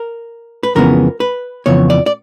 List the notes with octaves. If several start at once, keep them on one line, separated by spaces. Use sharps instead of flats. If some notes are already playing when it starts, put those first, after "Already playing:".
Already playing: A#4
B4
F2 C#3 E3 G#3 B3 A#4
B4
F2 C#3 E3 B3 C#5
D5
D5